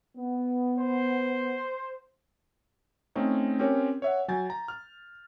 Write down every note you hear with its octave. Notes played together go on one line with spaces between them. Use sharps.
B3
C5
A3 C4 C#4 D#4
C4 C#4 G4 A#4 C#5
C#5 E5 F#5
F#3 G#5 G6 A6
A#5
F6